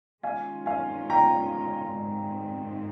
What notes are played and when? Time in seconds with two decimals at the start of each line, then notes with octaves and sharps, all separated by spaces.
0.23 D#3 G#3 C#4 F4 F5 G#5
0.66 F5 G#5
1.10 G5 A#5
1.95 G#2 D#3 G#3 C4